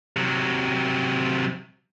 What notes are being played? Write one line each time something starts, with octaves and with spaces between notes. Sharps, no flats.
C3 F#3